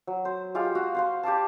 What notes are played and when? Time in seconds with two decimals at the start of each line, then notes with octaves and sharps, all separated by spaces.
0.07 F#3
0.25 C5
0.55 G#3 F4 G4 F5
0.75 F#4 F5
0.95 C5 F5 C6
1.23 G4 D5 F5 A5